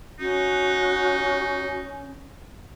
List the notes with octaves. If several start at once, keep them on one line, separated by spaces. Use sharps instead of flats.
C#4 D#4 F#4